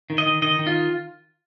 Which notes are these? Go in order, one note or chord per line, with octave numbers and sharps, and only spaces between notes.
D#3
D#5
D#3
D#3 D#5
D#3
F4